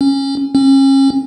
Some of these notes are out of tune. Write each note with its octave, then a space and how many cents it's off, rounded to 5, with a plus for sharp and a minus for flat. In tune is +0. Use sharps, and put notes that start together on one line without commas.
C#4 -15
C#4 -35